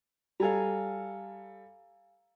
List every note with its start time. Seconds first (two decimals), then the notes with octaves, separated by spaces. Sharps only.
0.40 G3 A4 F5 G#5 A#5